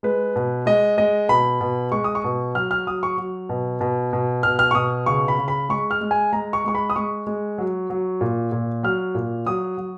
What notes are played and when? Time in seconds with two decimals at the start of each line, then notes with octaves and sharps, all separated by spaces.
0.03 G#3 B4
0.36 B2
0.66 G#3 D#5
0.98 G#3 D#5
1.29 B2 B5
1.61 B2
1.92 G#3 C#6
2.04 D#6
2.15 C#6
2.24 B2
2.55 F#3 F6
2.71 F6
2.87 F#3 D#6
3.03 C#6
3.18 F#3
3.49 B2
3.81 B2
4.13 B2
4.43 B2 F6
4.59 F6
4.71 C#6
4.75 B2 D#6
5.06 C#3 C#6
5.28 B5
5.38 C#3
5.48 B5
5.69 G#3 C#6
5.91 F6
6.01 G#3
6.11 G#5
6.33 G#3 A#5
6.53 C#6
6.64 G#3 C#6
6.75 B5
6.90 D#6
6.96 G#3 C#6
7.27 G#3
7.58 F#3
7.90 F#3
8.21 A#2
8.52 A#2
8.83 F#3 F6
9.15 A#2
9.46 F#3 D#6
9.78 F#3